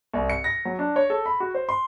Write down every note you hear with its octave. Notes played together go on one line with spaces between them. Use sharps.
C2
C#7
A#6
F#3
D4
C#5
A4
B5
F#4
C5
C6